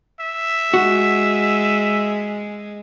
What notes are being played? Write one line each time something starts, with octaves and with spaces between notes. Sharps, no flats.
E5
G#3 F#4